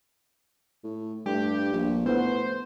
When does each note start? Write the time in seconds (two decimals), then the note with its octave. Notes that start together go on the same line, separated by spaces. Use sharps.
0.84 A2
1.26 G2 A3 G4
1.72 A#1
2.06 A2 B3 C5